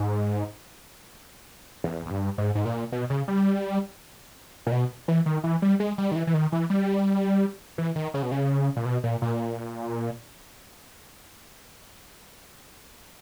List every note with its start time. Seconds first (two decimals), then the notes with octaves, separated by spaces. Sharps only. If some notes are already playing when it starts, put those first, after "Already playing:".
Already playing: G#2
1.84 E2
2.06 E2
2.11 G2
2.38 G#2
2.55 G#2
2.65 A#2
2.92 B2
3.10 C#3
3.28 G3
4.67 A#2
4.72 B2
5.08 E3
5.26 D#3
5.44 E3
5.62 G3
5.80 G#3
5.98 G3
6.11 D#3
6.16 E3
6.27 E3
6.34 D#3
6.52 E3
6.70 G3
7.78 E3
7.95 D#3
8.14 C#3
8.23 B2
8.31 C#3
8.76 A#2
8.85 B2
9.04 A#2
9.22 A#2